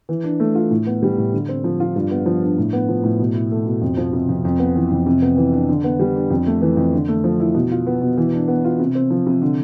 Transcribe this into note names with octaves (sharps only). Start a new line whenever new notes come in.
E3
D4
A3
F4
A2
B3
G3
A2
D3
C4
F3
F4
G2
B3
F3
D4
A2
B3
F3
A2
B2
E4
A3
B2
F2
F3
C3
F2
F2
B3
E3
F2
C3
B3
E3
D4
D3
B3
G3
D4
F2
A3
E3
F2
D3
A3
F3
E4
B2
F4
B3
B2
E3
D4
B3
F4
C3
C4
F3
C3
D3